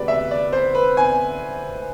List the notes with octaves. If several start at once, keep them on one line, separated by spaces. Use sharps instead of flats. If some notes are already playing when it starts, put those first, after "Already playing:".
Already playing: D2 C3 G#3 B4 D5
E5
D5
C5
B4
G#5